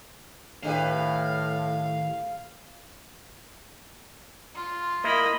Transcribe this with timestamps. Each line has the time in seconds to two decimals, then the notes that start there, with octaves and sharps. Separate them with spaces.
0.63 A2 D#3 D4 G4 B4 F5
4.55 F4
5.04 A#3 E4 D#5 B5